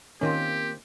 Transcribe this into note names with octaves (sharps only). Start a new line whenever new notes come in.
D#3 A#3 C4 C#4 F4 G4